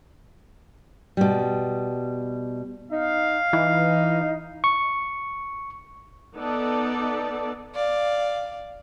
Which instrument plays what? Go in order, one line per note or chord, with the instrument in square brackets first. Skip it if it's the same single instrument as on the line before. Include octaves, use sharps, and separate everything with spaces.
[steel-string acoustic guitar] B2 G3
[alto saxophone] D#4 [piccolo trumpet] F5
[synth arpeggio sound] E3 [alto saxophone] D#4
[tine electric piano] C#6
[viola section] B3 D#4 A4 D5
[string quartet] D5 F5